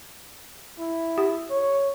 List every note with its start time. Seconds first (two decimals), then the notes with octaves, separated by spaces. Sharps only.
0.78 E4
1.18 G4
1.50 C#5